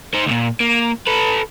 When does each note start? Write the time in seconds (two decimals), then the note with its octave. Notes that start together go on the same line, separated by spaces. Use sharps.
0.14 D#4 C5
0.26 D2 A#2
0.60 A#3
1.07 A4 B4